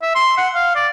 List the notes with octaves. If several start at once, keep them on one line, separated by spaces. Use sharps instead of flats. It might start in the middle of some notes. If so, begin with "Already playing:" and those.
E5
C6
F#5
F5
D5